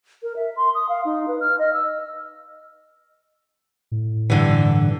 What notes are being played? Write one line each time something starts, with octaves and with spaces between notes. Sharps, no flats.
A#4
E5
C6
D#6
F5
D#4
B4
F6
D#5
E6
A2
G2 D3 E3